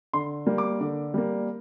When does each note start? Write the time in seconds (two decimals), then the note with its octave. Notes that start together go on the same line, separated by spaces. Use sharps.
0.13 D3 C6
0.46 G3 A#3
0.58 D6
0.80 D3
1.14 G3 A#3